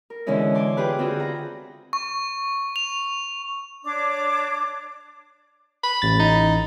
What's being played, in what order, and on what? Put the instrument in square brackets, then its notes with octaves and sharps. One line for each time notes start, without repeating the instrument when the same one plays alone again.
[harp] A#4
B2 D3 E3 G#3 C#4 E4
G#5 A5 C6 D6
F4 G4 G#4 B4 F#6
D3 C4 F4 F#4 G#4
F#5 A#5
[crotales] C#6
F7
[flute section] D4 C#5 D6
[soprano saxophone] B5
[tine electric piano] A1 A6
[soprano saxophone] D#4